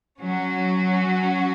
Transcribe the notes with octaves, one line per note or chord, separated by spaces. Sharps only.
F#3 C#4 F#4